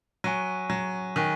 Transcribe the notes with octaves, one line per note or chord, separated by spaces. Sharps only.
F#3 G#5 C#6 F#6 B6 D#7
F#3
D#3 G#5 C#6 F#6 B6 D#7